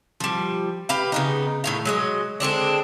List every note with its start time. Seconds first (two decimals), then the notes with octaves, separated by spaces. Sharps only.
0.20 F3 G3
0.89 G4 B4 F5
1.12 C#3 B3 D#4
1.64 A2 D#3 F5
1.85 F#3 G#3 D#5
2.40 D3 G#3 C4 D4